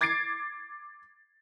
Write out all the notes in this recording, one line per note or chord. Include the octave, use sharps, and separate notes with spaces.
D6 G#6 A6 C7 D7